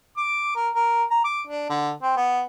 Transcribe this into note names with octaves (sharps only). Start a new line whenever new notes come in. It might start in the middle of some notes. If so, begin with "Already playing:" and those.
D6
A#4
A#4
A#5
D6
D4
D3
C4
B3